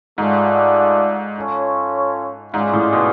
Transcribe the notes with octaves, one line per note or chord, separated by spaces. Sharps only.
G#2 A3 F4 G#4 D5 F#5
C#4 F4 A4 C#5
G#2 G#3 C#4 F4 G#4 D5
A2
B2